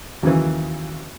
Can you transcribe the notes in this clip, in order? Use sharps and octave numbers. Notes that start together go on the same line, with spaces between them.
D#2 C#3 E3 F#3